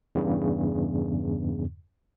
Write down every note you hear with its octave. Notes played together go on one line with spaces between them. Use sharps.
E2 G2 C#3